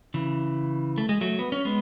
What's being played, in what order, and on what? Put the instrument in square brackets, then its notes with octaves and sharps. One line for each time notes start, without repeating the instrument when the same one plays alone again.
[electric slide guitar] C#3 E3
A3
G#3
F#3 A3
B3
C#4
G#3 B3